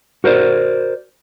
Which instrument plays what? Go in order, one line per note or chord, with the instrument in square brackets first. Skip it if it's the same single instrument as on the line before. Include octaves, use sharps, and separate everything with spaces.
[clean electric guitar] F#4 A#4 C5 D5